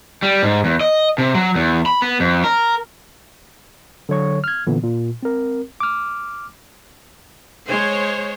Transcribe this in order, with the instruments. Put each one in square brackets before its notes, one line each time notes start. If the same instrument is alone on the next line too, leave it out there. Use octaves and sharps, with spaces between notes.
[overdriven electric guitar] G3
G#2
E2
D#5
C3
F#3
E2
B5
B3
F2
A#4
[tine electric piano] D3 F#3 C#5 C#6
F6 G#6
A#2 D3 E3 B3
A#2
C4 A#4
D6 F6
[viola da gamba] G#3 [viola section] C5 C#5